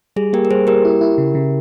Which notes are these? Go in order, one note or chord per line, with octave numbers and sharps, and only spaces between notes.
G3 G#4
A#3 G4 A#4
A#4
G3 G#4 C5
A#3 G4 A#4
E4
E4
C#3
C#3